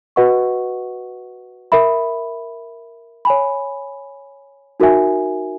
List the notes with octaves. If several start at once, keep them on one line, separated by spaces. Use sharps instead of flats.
F#4 B4 D#5 F#5 C#6
A#4 E5 B5
C#5 G#5 B5
D#4 F#4 A#4 E5 G#5